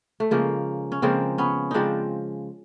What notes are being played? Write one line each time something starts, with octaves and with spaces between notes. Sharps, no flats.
A3
C#3 F3 G#3 A#3
C#4
C#3 F3 G#3 A#3 C4
B3 C#4
C#3 F3 G#3 C4 D4 D#4